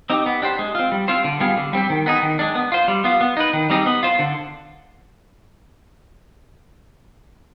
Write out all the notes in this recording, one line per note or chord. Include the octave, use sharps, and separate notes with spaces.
C4 D#4 G4
B3
D4 G4 C5
G#3
C4 F4
G3
C4 F4 C5
D3
G3 B3 F4 G#4
D3
G3 C4 G4
D#3
B3 D#4 G#4
D#3
G#3 D4
B3
F4 C5
G3
B3 F4
B3
D#4 B4
D#3
G3 C4 D#4 G#4
B3
F4 C5
D3